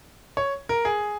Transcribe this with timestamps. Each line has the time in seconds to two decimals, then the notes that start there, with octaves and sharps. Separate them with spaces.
0.37 C#5
0.69 A#4
0.85 G#4